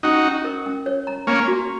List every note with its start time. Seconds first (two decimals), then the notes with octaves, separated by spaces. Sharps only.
0.03 C#4 D#4 F#4
0.24 C#4
0.44 A#4
0.66 C#4
0.86 C#5
1.07 A#5
1.27 A#3 C#4 A#5
1.48 F#4